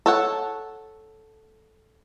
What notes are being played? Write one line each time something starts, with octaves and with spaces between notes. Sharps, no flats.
A4 C#5 F#5